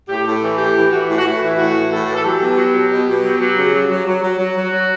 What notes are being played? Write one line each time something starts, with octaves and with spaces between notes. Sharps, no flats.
A2 G4
A2 A4
E3
A2 G4
E3
E3 F#4
A2
F#4
A2 E4
E3
A2 F#4
E3
A2 A4
E3
A4
F#3 G4
B2
F#3
B2
B2
B2
F#3
F#3
C#3
F#3
F#3
F#3
F#3 F#4
F#3
F#3
F#3